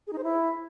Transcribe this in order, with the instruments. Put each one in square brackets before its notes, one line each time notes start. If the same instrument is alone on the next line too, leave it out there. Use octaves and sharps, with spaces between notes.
[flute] G#4
D#4
C5
E4